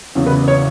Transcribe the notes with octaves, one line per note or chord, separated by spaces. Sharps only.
E2 C#3 F#3 C#4
B4
C#5